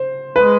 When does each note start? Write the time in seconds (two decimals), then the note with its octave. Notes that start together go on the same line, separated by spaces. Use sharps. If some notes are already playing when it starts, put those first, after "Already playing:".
Already playing: C5
0.36 G#3 B4